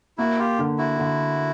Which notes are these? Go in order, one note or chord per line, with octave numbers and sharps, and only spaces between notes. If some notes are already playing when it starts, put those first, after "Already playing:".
A#3 E4 F#4
F4 G4
D3
E4 F#4
D3